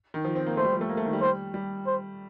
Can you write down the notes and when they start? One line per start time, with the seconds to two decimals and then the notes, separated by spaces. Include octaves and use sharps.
0.14 D#3
0.25 F3
0.35 C4
0.46 A#3
0.57 A3 C5
0.65 G3
0.73 F3
0.81 A3
0.89 A#3
0.97 A3
1.05 D#3
1.13 G3
1.21 C5
1.54 G3
1.86 C5